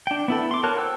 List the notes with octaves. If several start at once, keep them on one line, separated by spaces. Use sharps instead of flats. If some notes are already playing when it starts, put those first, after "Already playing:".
D4 G5
B3 E4 A4
C6 D6
F#4 A#4 C#5 A5 F#6
C5 G5 E6 F#6